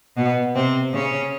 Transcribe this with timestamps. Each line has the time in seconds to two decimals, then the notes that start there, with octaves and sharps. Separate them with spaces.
0.16 B2 B3
0.54 C3 C4
0.93 C#3 C#4